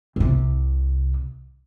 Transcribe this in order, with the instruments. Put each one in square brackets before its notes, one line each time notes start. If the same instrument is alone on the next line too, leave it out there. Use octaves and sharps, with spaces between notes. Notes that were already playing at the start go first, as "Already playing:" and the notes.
[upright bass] C2 C3